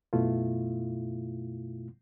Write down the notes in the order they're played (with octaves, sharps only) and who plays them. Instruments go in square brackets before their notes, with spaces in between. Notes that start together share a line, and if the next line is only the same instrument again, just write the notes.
[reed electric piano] F#2 B2 A3 E4 F4